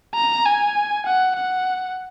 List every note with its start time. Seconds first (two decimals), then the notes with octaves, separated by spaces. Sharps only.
0.15 A#5
0.45 G#5
1.06 F#5
1.36 F#5